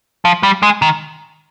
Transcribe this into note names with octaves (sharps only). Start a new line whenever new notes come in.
F3
G3
G#3
D#3